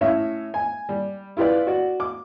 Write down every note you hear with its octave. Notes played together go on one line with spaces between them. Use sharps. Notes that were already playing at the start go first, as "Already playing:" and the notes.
A2 C#4 E5
G#5
G3
E4 F4 G4 B4 D5
F#4 D5
D6